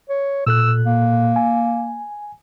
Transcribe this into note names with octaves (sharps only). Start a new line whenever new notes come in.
C#5
A#2 A4 E6 F#6
A#3
G#5